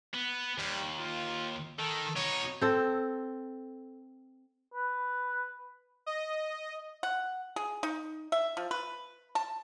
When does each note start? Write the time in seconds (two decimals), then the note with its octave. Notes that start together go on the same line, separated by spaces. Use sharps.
0.14 B3
0.58 D#2 G3
0.98 F4
1.79 D#3 A4
2.16 B2 D#4 C#5
2.61 C4 A4
4.74 B4
6.06 D#5
7.03 F#5
7.56 G#4
7.83 D#4
8.32 E5
8.57 F3
8.71 B4
9.35 A5